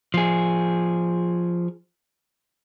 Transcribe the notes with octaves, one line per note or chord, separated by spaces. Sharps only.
F3 G#4